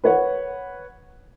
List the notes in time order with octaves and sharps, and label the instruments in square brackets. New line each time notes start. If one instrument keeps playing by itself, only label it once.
[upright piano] B4 C#5 F#5